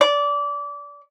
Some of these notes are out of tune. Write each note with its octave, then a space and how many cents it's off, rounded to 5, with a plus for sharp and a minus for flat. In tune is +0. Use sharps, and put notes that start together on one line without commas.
D5 -25